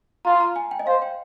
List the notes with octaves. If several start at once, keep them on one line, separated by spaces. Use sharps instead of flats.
F4 A#5
A#5
G#5
G5
D#5
C5 F5
G5